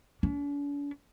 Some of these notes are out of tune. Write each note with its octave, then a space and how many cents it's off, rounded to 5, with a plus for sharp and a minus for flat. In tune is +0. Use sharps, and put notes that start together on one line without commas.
D4 -45